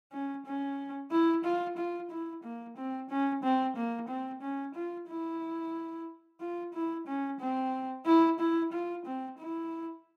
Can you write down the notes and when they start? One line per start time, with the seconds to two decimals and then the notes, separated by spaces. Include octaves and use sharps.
0.12 C#4
0.46 C#4
1.11 E4
1.44 F4
1.77 F4
2.11 E4
2.43 A#3
2.77 C4
3.10 C#4
3.43 C4
3.76 A#3
4.09 C4
4.42 C#4
4.75 F4
5.08 E4
6.40 F4
6.74 E4
7.07 C#4
7.40 C4
8.06 E4
8.40 E4
8.72 F4
9.06 C4
9.38 E4